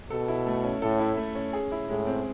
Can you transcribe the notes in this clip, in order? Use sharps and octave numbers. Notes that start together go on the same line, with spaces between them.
B2 A4
E4
A3
C#4
A2 A4
E4
A3
C#4
G#4
E4
A2 G#3
C4